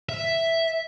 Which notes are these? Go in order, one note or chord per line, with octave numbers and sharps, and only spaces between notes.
E5